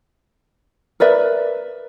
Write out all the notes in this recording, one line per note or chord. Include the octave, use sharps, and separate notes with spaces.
A#4 B4 D5 E5